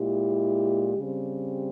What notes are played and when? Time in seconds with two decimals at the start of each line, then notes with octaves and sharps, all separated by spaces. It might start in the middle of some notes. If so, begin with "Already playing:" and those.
Already playing: A#2 G#3 E4 G4
0.98 C#3 G3 C4 G4